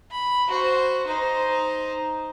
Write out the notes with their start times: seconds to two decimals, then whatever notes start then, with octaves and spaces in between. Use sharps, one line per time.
0.11 B5
0.48 F#4 C5
1.07 D#4 C5